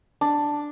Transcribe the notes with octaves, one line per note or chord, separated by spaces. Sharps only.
D4